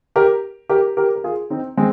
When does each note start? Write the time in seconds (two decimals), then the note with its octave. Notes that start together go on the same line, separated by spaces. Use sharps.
0.16 G4 A#4
0.69 G4 A#4
0.97 G4 A#4
1.16 A#4
1.24 F4 G#4
1.50 C4 D#4
1.77 G#3 C4